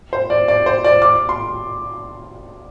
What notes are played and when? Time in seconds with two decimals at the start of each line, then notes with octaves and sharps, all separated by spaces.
0.13 C5
0.30 D5
0.48 D5
0.66 C5
0.84 D5
1.02 D6
1.29 C6